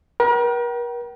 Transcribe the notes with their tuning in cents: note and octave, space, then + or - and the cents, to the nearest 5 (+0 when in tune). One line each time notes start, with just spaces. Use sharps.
A#4 +40 G5 -35